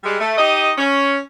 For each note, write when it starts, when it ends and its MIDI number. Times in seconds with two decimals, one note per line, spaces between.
0.04 0.18 55
0.04 0.18 56
0.20 0.33 57
0.38 0.70 63
0.38 0.70 67
0.38 0.70 75
0.78 1.18 61